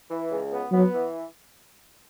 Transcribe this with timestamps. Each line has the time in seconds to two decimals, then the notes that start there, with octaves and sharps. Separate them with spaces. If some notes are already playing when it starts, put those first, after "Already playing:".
0.10 E3
0.30 C#2
0.52 B3
0.72 F#3 B3
0.94 E3